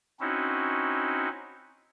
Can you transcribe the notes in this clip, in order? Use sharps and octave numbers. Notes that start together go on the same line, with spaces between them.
C4 C#4 D#4 E4 F#4